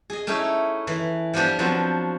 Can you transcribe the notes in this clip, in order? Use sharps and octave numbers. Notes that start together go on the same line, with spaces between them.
G#4 D#5
A3 C#4 D#4 E4
E3
F3 G3 B3 D4 G4
F3 F#3 B3 C4